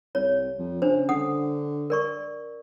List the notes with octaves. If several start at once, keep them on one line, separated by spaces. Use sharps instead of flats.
C2 C#5
F2
C#3 D4 C5
D3 F#5 D#6
A#4 D5 C#6